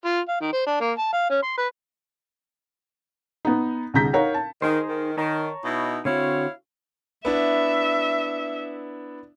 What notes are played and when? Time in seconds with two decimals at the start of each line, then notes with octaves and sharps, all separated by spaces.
0.05 F4
0.28 F5
0.41 D#3
0.52 C5
0.66 D4
0.81 A#3
0.98 A5
1.13 F5
1.30 C#4
1.42 C6
1.58 B4
3.45 B3 D#4
3.94 C2 D3 G#4 A#5 G6 B6
4.13 D#4 A#4 C#5 F5 F#5 A#5
4.34 A5
4.62 D#3 D#4 G#4 C5
4.88 D#3
5.17 D#3 C#5 A5 A#5
5.64 B2 D#4 E4
6.05 D3 C4 E4 F#4 C#5 F5
7.25 B3 D4 E4 E5